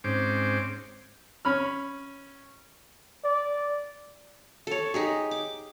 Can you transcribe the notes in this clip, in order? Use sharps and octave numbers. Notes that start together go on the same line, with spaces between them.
G#2 C4 C#4 C5 D6
C#4 B5 F6
D5
A4 C#5
D#4 G4 G#4
D6